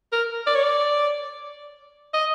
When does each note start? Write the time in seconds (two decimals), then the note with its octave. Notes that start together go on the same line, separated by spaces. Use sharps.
0.12 A#4
0.47 D5
0.55 C#5
0.63 D5
2.14 D#5